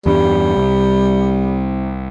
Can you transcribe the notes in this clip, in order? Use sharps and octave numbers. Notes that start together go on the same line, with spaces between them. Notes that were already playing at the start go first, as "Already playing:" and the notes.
E2 G2 G3
C2